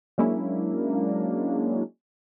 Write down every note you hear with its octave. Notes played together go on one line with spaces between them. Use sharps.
F#3 G#3 A#3 C#4 D4 E4